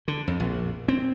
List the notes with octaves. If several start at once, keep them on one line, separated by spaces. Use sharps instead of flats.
D3
F2
A#1
C4